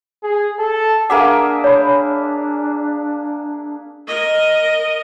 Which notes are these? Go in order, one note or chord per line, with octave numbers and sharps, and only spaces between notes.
G#4
A4
A#3 D4 G#4 E5 F#5 D6
C#5 B5
A#4 D#5